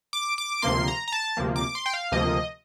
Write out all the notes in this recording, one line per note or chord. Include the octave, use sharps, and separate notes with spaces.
D6
D6
D2 C3 F3 A#3 C6
A#5
A#5
A5
D2 C3 F3 A#3
D6
C6
G5
F5
D2 C3 F3 A#3 D#5